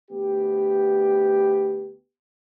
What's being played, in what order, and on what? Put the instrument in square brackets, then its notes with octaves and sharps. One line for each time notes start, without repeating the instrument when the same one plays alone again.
[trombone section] D2 B3 G4